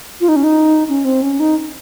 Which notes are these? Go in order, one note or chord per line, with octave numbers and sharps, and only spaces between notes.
F4
D#4
C#4
D#4
C#4
C4
C#4
D#4